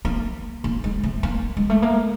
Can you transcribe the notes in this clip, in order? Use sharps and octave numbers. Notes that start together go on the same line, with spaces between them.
A#3
A#3
G#3
A3
A#3
G#3
A3
A#3